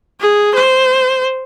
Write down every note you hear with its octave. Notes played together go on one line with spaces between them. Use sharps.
G#4
C5